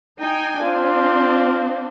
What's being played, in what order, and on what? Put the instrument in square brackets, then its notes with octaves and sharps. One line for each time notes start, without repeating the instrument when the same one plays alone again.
[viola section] D#4 G5 G#5
[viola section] C4 D4 [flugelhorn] F4